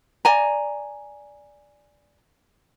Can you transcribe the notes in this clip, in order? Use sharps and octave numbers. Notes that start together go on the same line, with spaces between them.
D5 G#5 A#5